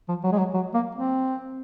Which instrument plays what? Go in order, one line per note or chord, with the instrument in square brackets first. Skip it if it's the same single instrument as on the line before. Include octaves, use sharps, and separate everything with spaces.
[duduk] F3
F#3
G#3
F#3
F#3
A#3
C4